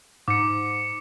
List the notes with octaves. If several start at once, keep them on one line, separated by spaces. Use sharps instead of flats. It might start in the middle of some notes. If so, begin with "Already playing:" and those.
G#2 D6 C#7